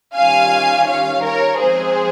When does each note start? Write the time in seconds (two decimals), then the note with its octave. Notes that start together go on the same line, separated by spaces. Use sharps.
0.16 D#3 G3 C#4 F4 F5 G#5
0.88 C#5 F5
1.24 A#4 C#5
1.60 F3 G#3 C4 G#4 C5